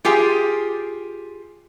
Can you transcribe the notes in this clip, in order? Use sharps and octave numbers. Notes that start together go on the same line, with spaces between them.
F4 G4 G#4 G5